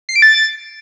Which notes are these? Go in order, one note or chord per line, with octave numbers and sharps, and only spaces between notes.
C7
D7
A6